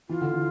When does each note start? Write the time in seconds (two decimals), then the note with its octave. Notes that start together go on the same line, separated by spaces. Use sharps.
0.09 E3 F4
0.21 D3
0.33 E3